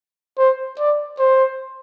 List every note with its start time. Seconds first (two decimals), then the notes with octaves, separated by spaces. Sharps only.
0.37 C5
0.78 D5
1.19 C5